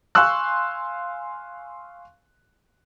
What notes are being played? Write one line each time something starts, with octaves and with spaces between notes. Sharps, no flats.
F5 G#5 C6 C#6 E6 F#6